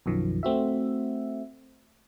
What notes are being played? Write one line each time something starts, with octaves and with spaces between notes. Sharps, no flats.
B1 F#2 D#3 F3
A3 C4 F#4 E5